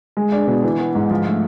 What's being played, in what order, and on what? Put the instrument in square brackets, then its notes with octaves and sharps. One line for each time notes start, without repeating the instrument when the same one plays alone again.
[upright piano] G#3
D4
B2
E3
B3
G#2
F3
A3